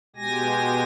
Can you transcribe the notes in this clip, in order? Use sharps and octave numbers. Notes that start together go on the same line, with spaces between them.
B2 G#3 G4 G#5 A#6